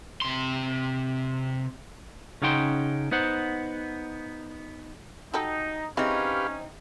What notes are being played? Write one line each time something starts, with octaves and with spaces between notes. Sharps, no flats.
C3 C6
C#3 C#4 D#4 F#5 G5 C6
B3 D#4 C5 F#5
D#4 F#4 G4 A4
G#3 C4 C#4 D#4 E4 G4 B4 F5